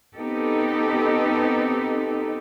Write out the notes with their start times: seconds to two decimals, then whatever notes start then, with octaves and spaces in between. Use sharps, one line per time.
0.18 B3 C4 D#4 G4 A4